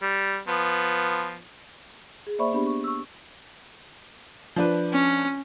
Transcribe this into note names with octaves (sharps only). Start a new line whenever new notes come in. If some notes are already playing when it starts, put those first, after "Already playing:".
G3
F3 B3
G#4
A#3 C5 D5 E5 B5 C#6
B3 D4 G4 B5
C#6
C#6 E6
F3 D4 B4
C#4